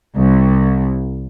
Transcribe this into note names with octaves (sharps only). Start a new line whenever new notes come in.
C2